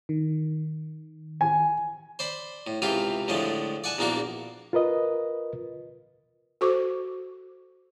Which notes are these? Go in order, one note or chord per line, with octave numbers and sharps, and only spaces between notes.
D#3
G#5
C5 D5 B5
A2
C#2 C3 E3 F4 G5
A2 D3 F3 G#3 A3
D5 F#5 G#5 A5
A#1 E2 A#3 D4 F#4 D6
F4 A#4 B4 D#5
F#4 A4 C5 C#6 D6